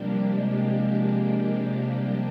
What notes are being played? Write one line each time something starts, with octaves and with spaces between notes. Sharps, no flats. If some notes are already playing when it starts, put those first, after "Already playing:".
Already playing: C3 F3 G3 A#3 D4 G4
G#3
G3